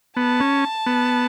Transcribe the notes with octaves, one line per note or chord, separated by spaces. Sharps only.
B3 A5
C#4
B3